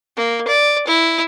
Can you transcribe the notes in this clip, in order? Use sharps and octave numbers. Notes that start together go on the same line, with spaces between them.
A#3
D5
E4